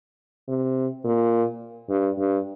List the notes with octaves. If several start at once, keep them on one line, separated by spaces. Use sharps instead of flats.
C3
A#2
G2
G2